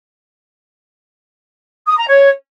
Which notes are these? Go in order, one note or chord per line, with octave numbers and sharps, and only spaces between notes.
D#6
A#5
C#5